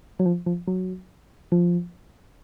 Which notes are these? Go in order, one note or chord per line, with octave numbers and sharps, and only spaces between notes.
F#3
F3
F3
F#3
F3